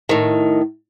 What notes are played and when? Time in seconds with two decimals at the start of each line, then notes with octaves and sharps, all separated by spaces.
0.09 A2 D#3